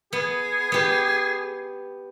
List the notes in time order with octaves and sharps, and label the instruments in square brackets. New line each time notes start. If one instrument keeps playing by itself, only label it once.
[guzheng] B3 [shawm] G#4
[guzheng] B3 G4